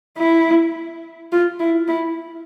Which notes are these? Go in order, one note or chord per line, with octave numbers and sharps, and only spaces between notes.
E4
F4
E4
E4